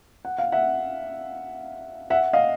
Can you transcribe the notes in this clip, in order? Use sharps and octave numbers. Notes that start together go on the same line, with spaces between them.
F#5
F5
E5 F#5
E5 F#5
D#5 F5